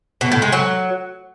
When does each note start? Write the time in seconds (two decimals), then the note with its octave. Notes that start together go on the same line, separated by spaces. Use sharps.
0.21 B2
0.32 A2
0.42 G#3
0.52 F#3